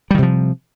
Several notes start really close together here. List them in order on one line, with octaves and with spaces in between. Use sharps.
G3 D#3 C3 F3